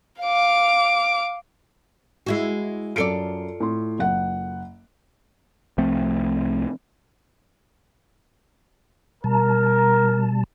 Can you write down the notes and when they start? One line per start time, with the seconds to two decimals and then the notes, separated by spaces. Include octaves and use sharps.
0.21 F5 D6
2.26 G#3 E4 F#4
2.96 F#2 F4 A4 D5 C#7 D7
3.60 A2 C6
3.99 F#1 F#5
5.78 C2 F3 A3 C4
9.24 B2 G3 A#4 A5